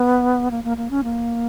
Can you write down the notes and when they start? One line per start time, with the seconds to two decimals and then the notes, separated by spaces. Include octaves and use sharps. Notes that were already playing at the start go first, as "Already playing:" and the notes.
Already playing: B3
0.51 A#3
0.64 A#3
0.77 A#3
0.90 C#4
1.04 A#3